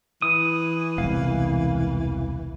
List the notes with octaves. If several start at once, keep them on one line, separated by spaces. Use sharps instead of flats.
E3 D#6
E1 C2 F5